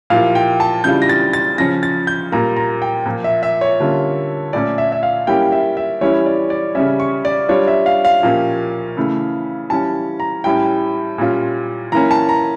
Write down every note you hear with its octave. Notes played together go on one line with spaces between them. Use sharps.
A#2 F3 A#3 E4 G4 F5
G5
A5
C#3 E3 G3 D4 F4 G6
A#6
A6
A6
C#3 F3 C#4 A#6
A6
G6
A#2 G3 A#3 A#5
A#5
G5
A#2 F3 A#3
E5
E5
C#5
D3 G3 A#3 C#4 F4
A#2 A3 C#4 D5
E5
E5
F5
G3 A#3 C#4 E4 G4 G5
E5
E5
E3 G3 C#4 E4 C#5
D5
D5
C#3 G3 C#4 E5
C#6
D5
G3 D4 F4 C#5
E5
F5
F5
A#2 F3 A#3 C#4 G4
C#3 E3 A3
E3 G3 C#4 A5
A#5
A2 G3 C#4 E4 G5
A#2 G3 C#4 F4
E3 A#3 C#4 A#5
A5
A#5